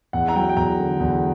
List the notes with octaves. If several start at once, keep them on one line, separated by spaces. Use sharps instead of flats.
E2 F#5
A#5
F#3 G5
G5
E2 A#5
D3
E2